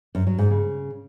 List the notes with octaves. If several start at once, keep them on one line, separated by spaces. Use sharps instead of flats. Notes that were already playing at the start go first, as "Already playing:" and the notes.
F#2
F#3
G#2
C#3